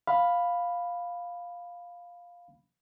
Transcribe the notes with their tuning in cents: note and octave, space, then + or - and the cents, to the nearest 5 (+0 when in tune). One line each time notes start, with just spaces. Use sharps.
F5 +5 B5 +0